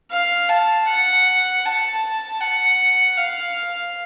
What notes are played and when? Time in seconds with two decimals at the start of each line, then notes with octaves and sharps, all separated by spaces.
0.11 F5
0.49 A5
0.88 F#5
1.65 A5
2.41 F#5
3.17 F5